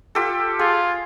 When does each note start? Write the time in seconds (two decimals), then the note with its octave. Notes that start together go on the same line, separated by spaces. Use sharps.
0.15 F4 G4 A4
0.59 F4 G#4